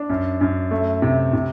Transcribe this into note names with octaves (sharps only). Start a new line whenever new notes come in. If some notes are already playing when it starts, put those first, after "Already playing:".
Already playing: D4
F#2
F#2
A3
C3
C3